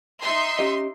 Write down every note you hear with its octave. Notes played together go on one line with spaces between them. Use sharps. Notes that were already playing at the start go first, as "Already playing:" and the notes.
D#4 E5 C6
C#4 G4 D#5